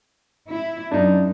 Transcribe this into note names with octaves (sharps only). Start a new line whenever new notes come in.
E4
F#2 D4 D#4